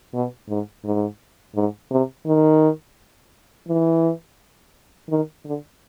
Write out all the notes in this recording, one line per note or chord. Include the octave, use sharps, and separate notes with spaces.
B2
G#2
G#2
G#2
C3
D#3
E3
D#3
D3